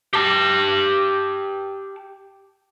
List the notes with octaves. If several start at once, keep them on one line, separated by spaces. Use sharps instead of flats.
G4 A5